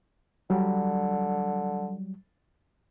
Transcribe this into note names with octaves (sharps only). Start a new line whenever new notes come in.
D3 F#3 G3